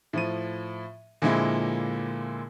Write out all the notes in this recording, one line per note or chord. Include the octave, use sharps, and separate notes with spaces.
A2 F3 D#7
A#2 D3 F3 G#3 A#3 E4